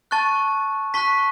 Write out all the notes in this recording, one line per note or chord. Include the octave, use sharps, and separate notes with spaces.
A5 C#6 F#6 A6
A5 C#6 F#6 B6